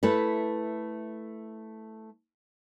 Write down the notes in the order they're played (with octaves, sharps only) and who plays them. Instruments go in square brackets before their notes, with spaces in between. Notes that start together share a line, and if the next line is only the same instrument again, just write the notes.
[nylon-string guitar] A3 E4 A4 B4